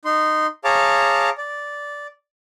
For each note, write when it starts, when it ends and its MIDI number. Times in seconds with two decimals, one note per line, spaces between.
0.05 0.47 63
0.05 0.47 84
0.65 1.30 68
0.65 1.30 73
0.65 1.30 77
0.65 1.30 81
0.65 1.30 82
0.65 1.30 86
1.38 2.07 74